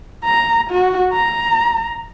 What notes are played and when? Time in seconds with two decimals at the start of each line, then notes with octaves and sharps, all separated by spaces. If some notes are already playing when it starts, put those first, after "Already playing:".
0.24 A#5
0.71 F#4
1.13 A#5